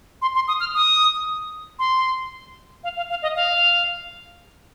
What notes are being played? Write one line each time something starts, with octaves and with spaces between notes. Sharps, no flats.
C6
C6
D#6
F6
D#6
C6
F5
F5
F5
D#5
F5